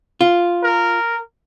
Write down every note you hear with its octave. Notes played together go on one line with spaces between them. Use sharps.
F4
A#4